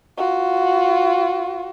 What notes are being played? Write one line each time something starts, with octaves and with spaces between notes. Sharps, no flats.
F4 F#4